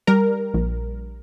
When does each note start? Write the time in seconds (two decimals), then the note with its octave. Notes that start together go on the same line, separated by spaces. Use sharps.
0.07 G3 A#4
0.54 A#1